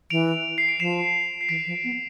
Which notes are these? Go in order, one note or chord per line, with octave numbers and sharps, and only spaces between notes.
E3 D7 F7
C7
D7
F3 C7 E7
C7
E3 B6 D7
F3
B3